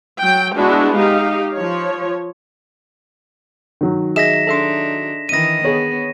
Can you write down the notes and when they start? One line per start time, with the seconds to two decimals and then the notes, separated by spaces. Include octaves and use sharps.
0.20 F#3 G5
0.56 G#3 B3 D4 E4 F#4
0.97 D#4 G4 F5
1.56 F3 C#5
3.81 D#3 F#3
4.16 G#4 D#5 E5 A#6 B6 E7
4.47 D4 D#4 A4 E5 C6
5.29 D#3 E3 D#5 A#6 D#7
5.65 B3 G#4 C#5